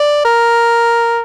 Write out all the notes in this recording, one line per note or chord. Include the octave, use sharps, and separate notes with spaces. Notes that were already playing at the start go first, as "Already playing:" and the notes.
Already playing: D5
A#4